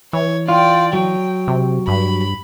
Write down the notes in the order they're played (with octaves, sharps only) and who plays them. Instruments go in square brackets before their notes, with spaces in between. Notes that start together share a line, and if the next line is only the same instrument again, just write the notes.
[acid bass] E3 [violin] C#5
[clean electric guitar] F4 [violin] D5 G5
[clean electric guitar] F#3 [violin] G5
[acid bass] C3
[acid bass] G2 [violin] B5